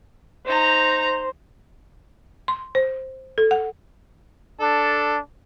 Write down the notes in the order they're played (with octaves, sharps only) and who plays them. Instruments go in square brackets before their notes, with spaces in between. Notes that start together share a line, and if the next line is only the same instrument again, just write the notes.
[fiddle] D#4 A#5 [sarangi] C5
[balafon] C6
C5
A4
F#5
[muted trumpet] D4 [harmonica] A4